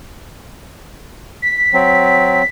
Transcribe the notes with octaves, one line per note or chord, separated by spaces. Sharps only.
B6
F#3 C4